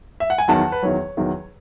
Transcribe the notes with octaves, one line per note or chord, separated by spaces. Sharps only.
E5
F#5
G#5
E2 D#3 F#3 F#5 A5
B4
E2 D#3 F#3 C#5
E2 D#3 F#3